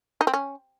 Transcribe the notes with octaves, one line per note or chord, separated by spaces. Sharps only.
D#4
C4
C#4